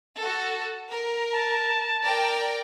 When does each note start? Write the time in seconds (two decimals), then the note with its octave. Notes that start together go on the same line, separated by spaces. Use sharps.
0.17 F#4 A4
0.90 A#4
1.32 A5
2.04 A#4 D5 G5